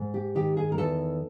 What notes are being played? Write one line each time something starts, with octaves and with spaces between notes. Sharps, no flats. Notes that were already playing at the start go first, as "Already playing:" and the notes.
Already playing: G#2
G4
D#3 G4
G#4
A#4
E2 A4